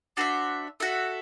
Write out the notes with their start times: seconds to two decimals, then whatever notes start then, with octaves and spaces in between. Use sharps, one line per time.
0.17 D4 F#4 C5 E5
0.80 F#4 A4 E5